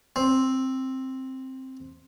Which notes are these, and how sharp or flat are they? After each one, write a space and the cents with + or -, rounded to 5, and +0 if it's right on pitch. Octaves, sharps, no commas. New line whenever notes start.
C4 +5